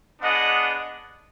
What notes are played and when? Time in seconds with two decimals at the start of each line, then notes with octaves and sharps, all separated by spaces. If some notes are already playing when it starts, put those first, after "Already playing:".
0.21 B3 D4 G#4 D#5 F#5